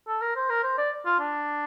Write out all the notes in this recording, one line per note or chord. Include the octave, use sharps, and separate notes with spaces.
A4
A#4
C5
A#4
C5
D5
F4
D4